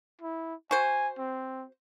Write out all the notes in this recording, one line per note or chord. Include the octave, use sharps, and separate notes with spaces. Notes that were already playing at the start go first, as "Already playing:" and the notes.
E4
F#4 C5 G#5
C4